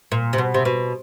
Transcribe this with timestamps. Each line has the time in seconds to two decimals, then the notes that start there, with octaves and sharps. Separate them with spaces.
0.12 A#2
0.33 C3
0.38 B2
0.54 C3
0.65 B2